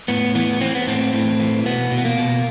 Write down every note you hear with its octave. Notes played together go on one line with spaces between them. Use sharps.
A2 B3
E3 B3
E3 C4
B3
A2 C4
A2
E3
B2 B3
B2
B3
A#3
B2